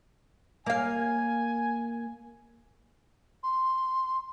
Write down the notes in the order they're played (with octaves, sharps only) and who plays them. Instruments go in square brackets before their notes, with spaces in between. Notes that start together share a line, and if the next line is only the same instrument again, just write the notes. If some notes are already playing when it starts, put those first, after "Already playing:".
[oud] A#3 F5 [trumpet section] G#5
[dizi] C6